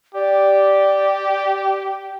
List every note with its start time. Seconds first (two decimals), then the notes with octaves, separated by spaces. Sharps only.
0.15 G4 D5